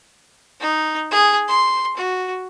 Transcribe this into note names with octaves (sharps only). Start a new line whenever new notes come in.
D#4
G#4
C6
F#4